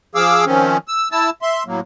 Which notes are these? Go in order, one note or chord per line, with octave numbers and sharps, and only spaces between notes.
F3 G#4 F5 D6 E6
D#3 F3 C4 C#4
E6
E4 A5 E6
E5 C6
A2 F#3 A#3